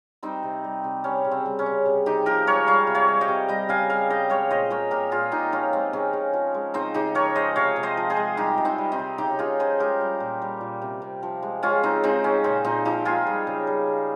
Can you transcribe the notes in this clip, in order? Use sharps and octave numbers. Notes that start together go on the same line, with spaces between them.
G3 C4 D#4
C3
G3
C3
G3 C#4
C#3
C4
G3
C#4
C#3
C3
C3 D#4 G4
F3 G4 A#4
G#3 A#4 C#5
G3 C#5 F5
C3
C#5 F5
G3
D#5 G5
C3
G3 D#5 G5
C#3 F5 G#5
G3 F5 G#5
C#3 D#5 G5
G#3 C#5 F5
A#2 C5 D#5
G#3 A#4 C#5
A#2 G4 A#4
A#2 F4 G#4
A#2 D#4 G4
F3 C#4 F4
G#3 C4
C#3 C#4
C#3
F3
G#3
C#3 C4 D#4
C#3 D#4 G4
F3 A#4 C#5
G#3 C5 D#5
C3 C#5 F5
C3
C5 D#5
F3
G#4 C5
G#3
G3 D#4 G4
C3
C4 D#4
G3
C4 D#4
C3
C#3 D#4 G4
C#3 F4 G#4
F3 G#4 C5
G#3 G4 A#4
G3
A#2
G3
A#2
C3
C3
F3
G#3
G#3 C#4 F4
C#3 C4 D#4
G#3 C4 D#4
C#3 C#4
A#2 C4
A#2 C4 D#4
F3 D#4 G4
G#3 F4 G#4
G3
C#3
G3
C#3